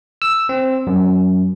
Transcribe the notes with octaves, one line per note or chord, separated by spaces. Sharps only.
E6
C4
F#2